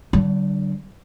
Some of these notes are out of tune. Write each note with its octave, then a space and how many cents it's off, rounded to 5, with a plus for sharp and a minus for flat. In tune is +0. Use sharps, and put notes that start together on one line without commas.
D3 +0 G3 -45